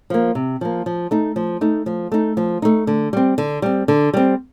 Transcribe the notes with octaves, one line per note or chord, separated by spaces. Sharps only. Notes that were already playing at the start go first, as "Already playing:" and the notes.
F3 A#3
C3
F3 A#3
F3
A3 D#4
F3
A3 D#4
F3
A3 D#4
F3
A3 D#4
D3
G3 C4
D3
G3 C4
D3
G3 C4